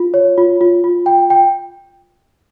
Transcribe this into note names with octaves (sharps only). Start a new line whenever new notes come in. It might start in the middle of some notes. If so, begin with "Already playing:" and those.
Already playing: F4
C#5
F4
F4
F4
G5
G5